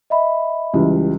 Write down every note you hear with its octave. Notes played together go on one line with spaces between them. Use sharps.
D#5 E5 B5
C#2 E3 G3